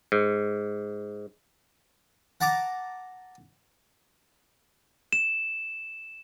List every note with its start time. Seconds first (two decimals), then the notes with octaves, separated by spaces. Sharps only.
0.12 G#2
2.41 F#5 A5 A#5 D6
5.13 E7